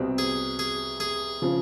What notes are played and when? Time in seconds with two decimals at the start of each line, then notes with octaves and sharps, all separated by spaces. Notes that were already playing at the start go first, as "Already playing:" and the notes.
Already playing: C2 B2 G3 C4
0.18 G#4
0.59 G#4
1.00 G#4
1.42 C#3 F3